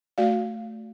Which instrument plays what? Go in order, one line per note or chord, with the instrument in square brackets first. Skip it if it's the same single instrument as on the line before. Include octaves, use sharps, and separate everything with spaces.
[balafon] A3 F#4 D5 F5